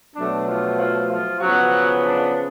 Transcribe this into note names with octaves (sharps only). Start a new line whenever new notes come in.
B2 F#3 A3 D4
F3 F4
F3 F4
F3 F4
C#3 F3 F#3 B3 F#4
D4